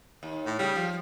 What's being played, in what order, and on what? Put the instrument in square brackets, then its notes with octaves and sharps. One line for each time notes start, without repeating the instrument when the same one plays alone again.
[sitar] D#2
[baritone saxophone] A2
[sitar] C#3 [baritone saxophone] G3
[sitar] F3